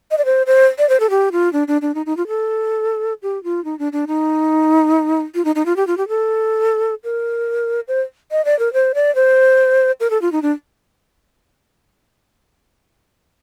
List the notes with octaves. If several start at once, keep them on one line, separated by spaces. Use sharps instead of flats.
D#5
D5
C5
C5
D5
C5
A4
G4
F4
D4
D4
D4
D#4
D#4
F4
A4
G4
F4
D#4
D4
D4
D#4
F4
D#4
D#4
F4
G4
F4
G4
A4
A#4
C5
D#5
D5
A#4
C5
D5
C5
A#4
A4
F4
D#4
D4